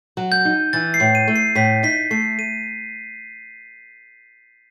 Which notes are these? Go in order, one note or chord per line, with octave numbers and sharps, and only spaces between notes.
F#3
G6
D#4
E3 A6
C7
A2
D#7
A3
C7
A2 B6
D#4 B6
A3 C7
D#7